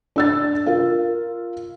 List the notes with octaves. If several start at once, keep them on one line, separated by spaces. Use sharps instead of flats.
D4 E6 A6
F4 A#4 F5